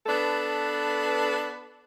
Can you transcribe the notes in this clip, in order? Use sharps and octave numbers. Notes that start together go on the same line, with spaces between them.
B3 D4 A4 B4